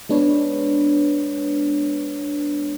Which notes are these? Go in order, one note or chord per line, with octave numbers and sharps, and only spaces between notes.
G#3 B3 D4 B4 C#5